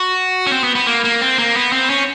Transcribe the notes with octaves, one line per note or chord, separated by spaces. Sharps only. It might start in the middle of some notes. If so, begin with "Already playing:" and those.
Already playing: F#4
C#4
C4
B3
B3
A#3
A#3
C4
A#3
B3
C4
C#4